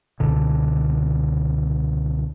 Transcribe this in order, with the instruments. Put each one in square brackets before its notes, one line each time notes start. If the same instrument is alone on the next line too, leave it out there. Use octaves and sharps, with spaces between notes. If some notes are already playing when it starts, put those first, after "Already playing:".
[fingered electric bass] C#2 B2 D3